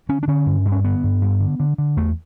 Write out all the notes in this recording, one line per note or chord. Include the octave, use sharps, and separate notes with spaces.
D3 C#4
D4
D3 C#4
G2
G2
C#4
D3 B3
G2
G2
D3
D3
D3
E2 A3